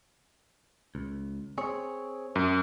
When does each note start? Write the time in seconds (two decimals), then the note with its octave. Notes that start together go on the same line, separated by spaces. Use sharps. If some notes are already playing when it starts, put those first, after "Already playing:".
0.95 C#2
1.58 C4 G#4 C#5
2.36 F#2